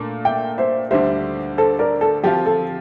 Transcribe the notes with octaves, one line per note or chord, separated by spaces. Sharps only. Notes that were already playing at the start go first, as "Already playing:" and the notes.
Already playing: A#2 A3 D4
E5 G5
C5 E5
D2 D3 G3 C5 E5
A4 C5
A#4 D5
A4
F3 C4 F4 G4
A4